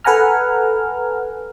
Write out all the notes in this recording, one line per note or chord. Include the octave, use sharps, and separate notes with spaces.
A4 B4 F#5 G#5 A#5 F6